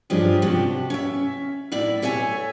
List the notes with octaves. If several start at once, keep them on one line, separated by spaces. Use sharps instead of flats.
G2 F3 G#3 C#4 D4 G4
C3 F#4 G4 A5
C#4 E5
A2 E4 D5 E5
A4 C#5 E5 F#5 G#5